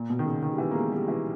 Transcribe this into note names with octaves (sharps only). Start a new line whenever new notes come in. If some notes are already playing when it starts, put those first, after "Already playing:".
Already playing: A#2
B2
D#3
C#3
D#3
G3
E3
A#3
G#3
G3
E3